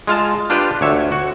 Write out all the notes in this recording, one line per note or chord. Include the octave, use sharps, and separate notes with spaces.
G#3 F4 F5 A5
D4 F4 G4 B4
D2 C#5 E5
F#4